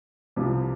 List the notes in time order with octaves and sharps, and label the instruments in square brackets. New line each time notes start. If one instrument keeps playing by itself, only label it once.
[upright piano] C2 C3 F3